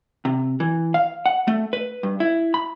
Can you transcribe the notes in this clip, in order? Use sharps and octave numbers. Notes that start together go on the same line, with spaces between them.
C3
E3
F5
F#5
A3
B4
G2
E4
B5